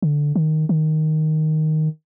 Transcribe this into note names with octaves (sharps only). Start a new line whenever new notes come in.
D3
D#3
D#3